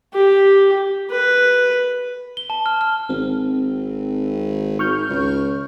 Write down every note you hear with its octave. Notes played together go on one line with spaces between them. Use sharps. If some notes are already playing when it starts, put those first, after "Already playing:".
G4
B4
G7
A5
F6
F6
G#1 C4
G#1 C#6 F6 G6
C#2